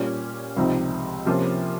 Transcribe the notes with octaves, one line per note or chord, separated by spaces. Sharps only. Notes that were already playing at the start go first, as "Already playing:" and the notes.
Already playing: A#2 G3 C#4 F4
C#2 C3 F3 C4 D#4
C3 F3 A#3 C#4 F4